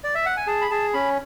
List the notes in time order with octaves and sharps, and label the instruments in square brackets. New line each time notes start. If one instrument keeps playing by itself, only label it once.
[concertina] D5
E5
F#5
G#5
G#4 A5
B5
G#4 A5
C#4 B5